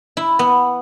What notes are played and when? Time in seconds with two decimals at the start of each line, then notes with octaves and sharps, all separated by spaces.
0.17 E4
0.39 B3